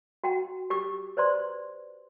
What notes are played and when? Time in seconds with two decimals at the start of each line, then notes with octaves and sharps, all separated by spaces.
0.24 F#4 F#5 G5
0.70 G4 D6
1.17 B4 C5 D5 C6